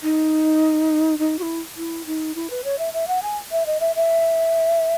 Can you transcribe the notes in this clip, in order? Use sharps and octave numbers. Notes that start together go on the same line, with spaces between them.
D#4
D#4
F#4
E4
E4
D#4
E4
B4
C#5
E5
E5
F#5
G#5
E5
D#5
E5
E5